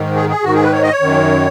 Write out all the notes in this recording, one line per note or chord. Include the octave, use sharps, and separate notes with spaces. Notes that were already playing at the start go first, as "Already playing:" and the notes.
Already playing: G#2 D#3
G#4
G#4
G#2 D#3 F#4
G#4
B4
C#5
D#5
C#5
F#2 D#3